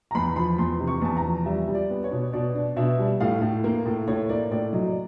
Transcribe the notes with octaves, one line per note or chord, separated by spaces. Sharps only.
A#5
E2 B5
F3 B5
E2 C6
C3
C#6
E2 A5
A#5
F3
G3 E5
G3
D5
B3
C#5
B2
B2 D5
D4
B2 E5
G3
A2 F5
A2
A#3
A2
A2 C#5
A#3 D5
A2 D5
F#3 D#5
D5